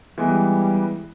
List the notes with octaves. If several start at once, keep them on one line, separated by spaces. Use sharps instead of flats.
E3 G3 G#3 B3